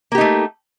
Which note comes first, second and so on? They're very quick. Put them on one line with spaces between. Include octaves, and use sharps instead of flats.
A#3 G4 D#4 A3